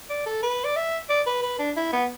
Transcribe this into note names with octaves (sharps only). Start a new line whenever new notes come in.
D5
A4
B4
D5
E5
D5
B4
B4
D4
E4
B3